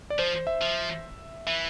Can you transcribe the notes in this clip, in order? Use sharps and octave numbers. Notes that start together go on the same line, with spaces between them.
D5
F3 C5
E5
F3
E3 E5